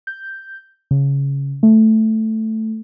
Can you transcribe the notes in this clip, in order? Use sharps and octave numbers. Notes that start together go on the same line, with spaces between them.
G6
C#3
A3